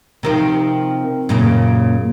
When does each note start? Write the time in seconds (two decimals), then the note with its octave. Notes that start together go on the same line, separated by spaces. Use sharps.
0.23 C3 D#3 F3
1.29 F#2 A#2 C#3